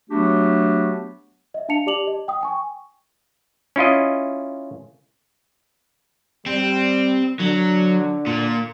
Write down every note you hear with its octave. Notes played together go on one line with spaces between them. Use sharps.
F#3 A3 B3 D4 F#4 G4
D#5 E5
D4 F5 A5 C#7 F7
G4 D5 A5 D6 F7 F#7
D#5
G5 D#6
G5 G#5 C#6
C#4 E4 F4 D#5
G3 C4
D3 F#3
A#2